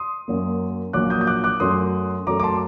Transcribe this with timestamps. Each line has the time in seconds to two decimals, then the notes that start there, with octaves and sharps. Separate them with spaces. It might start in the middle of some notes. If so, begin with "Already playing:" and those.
Already playing: C6 D#6
0.28 F#2 F#3 A#3
0.93 A#1 A#2 F#3 D6 F#6
1.10 D#6 G6
1.21 G6
1.27 D6 F#6
1.44 D6 F#6
1.60 F#2 F#3 A3 C6 D#6
2.27 F#2 F#3 A3 A#5 D6
2.40 D6
2.43 A5 C6